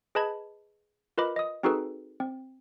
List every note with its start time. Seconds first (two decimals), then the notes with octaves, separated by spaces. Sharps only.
0.15 G#4 B4 D#5 A5 B5 G#6
1.18 F4 A#4 B4 D#5 B5 D6
1.36 D#5 D#6
1.63 C4 D#4 F#4 G#4 A4 B4
2.20 C4